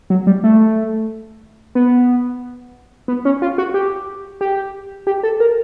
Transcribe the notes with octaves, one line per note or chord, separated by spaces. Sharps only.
F#3
G3
A3
B3
B3
C#4
F4
F#4
G4
G4
G4
A4
A#4